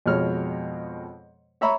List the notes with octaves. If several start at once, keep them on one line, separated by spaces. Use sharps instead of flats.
F2 B2 G#3 C#5 F6
C#5 E5 A#5 B5 C#6